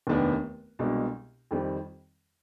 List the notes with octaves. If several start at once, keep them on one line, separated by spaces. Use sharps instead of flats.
F1 D#2 D#3 B3 D4
C2 B2 G#3 D4
F2 D#3 G3 C4